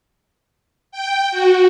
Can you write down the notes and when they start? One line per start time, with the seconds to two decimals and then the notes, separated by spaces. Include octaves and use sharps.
0.92 G5
1.31 F#4